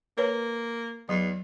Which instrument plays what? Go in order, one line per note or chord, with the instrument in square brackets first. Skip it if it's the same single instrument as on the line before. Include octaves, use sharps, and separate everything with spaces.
[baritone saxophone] A#3 [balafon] A#4 B4 C#5
[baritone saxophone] E2 [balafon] F#3